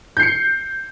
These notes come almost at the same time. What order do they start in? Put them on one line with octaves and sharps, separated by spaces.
G6 C7 C#7